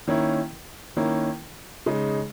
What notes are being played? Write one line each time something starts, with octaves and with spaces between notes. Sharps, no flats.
D#3 A#3 C#4 E4
D#3 A#3 C#4 E4
C#3 G#3 D#4